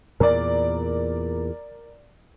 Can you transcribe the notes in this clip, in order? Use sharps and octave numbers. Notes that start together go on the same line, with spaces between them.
E2 A#2 A#4 D5